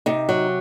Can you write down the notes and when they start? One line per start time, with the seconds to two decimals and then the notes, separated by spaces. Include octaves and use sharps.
0.06 C3 D#4
0.29 F#3